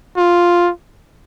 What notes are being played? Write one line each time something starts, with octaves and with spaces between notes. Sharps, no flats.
F4